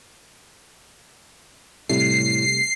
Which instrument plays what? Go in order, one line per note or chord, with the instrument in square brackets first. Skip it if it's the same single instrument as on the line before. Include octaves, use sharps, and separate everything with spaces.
[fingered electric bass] A2 [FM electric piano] C3 G3 A3 [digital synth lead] C7